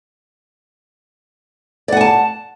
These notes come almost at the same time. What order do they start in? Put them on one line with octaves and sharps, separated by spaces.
D5 F#5 G#5 A5